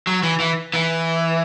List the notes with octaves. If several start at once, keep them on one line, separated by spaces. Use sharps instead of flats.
F#3
E3
E3
E3